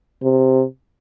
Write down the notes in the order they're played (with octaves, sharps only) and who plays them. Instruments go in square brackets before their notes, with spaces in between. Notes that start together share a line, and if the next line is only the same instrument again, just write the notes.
[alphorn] C3